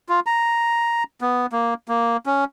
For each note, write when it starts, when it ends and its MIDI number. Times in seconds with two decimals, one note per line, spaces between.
0.09 0.20 65
0.26 1.03 82
1.21 1.46 59
1.52 1.74 58
1.88 2.17 58
2.26 2.45 61